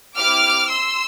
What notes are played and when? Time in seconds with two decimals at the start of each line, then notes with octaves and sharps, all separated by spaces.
0.16 C4 E4 G4 D6 F6
0.68 C6 E6